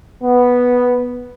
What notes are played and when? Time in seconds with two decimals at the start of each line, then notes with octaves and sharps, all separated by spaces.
0.22 B3